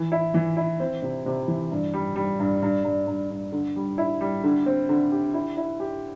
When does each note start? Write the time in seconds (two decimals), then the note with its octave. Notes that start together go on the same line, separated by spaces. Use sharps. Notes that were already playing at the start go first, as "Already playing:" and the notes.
Already playing: E3
0.12 E4
0.34 E3
0.57 E4
0.80 C4
1.02 C3
1.26 C3
1.48 E3
1.71 G2
1.94 G3
2.16 G3
2.39 G2
2.62 G2
2.84 G2
3.07 G2
3.30 G2
3.52 D3
3.76 G3
3.98 E4
4.21 G3
4.44 D3
4.66 C4
4.89 D3
5.12 G4
5.34 E4
5.57 E4
5.80 G4